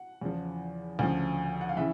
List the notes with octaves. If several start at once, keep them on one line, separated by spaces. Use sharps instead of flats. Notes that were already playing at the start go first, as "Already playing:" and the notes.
Already playing: F#5
E2 C#3 F3
D2 C#3 F3
F#5
F5
C#3 E3 E5